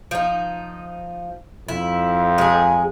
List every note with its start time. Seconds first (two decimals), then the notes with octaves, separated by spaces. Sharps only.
0.11 F3 D#4
1.68 F2 E4
2.38 G#3 G#4